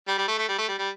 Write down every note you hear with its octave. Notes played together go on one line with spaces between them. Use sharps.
G3
G3
A3
A3
G3
A3
G3
G3